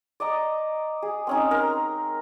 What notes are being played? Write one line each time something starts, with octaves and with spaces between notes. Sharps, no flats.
D5 D#5 A#5
G#4
C4 C#4 D#4
A#4 C6